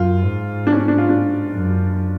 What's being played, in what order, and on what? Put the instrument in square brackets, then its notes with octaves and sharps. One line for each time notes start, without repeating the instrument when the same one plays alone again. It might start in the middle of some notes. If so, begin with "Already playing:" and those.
Already playing: [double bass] F#2 [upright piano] F4
[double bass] G#2
[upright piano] D4
C#4
D4
D4
F4
D4
[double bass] F#2